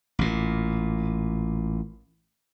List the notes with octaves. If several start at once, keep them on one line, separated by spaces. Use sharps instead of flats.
A1 A#2